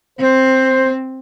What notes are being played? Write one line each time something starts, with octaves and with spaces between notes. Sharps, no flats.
C4 C5